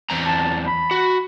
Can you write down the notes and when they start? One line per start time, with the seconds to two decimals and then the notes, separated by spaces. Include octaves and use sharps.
0.10 E2 C4 A#5
0.26 A5
0.67 B5
0.91 F#4